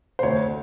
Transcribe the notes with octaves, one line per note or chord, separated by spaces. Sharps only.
C5
D2 C#5